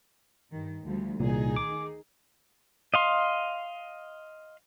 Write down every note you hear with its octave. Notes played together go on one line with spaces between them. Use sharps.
G2 D#3
D2 F3 G3
C2 A#2 D#3 D#4 G#4
D6
D#5 F5 C6